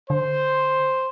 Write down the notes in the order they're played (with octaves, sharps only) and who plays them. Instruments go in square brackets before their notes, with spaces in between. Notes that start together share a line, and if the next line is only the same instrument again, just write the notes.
[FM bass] D3 [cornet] C5